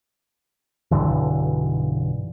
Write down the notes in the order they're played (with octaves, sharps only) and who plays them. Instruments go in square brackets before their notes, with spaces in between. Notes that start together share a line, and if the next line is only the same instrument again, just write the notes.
[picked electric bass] B1 G2 D3 E3